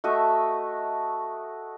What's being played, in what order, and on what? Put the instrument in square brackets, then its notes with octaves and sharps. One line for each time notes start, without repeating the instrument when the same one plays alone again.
[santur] A3 F#4 D#5 E5